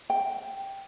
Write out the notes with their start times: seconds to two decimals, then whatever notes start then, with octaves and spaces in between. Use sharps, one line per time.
0.10 G5